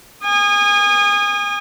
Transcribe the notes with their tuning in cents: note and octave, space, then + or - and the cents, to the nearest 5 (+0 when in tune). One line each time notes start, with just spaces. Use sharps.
G#5 -30 D#6 -20